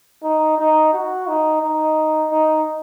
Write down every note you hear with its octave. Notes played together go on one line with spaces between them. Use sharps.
D#4
D#4
F#4
D#4
D#4
D#4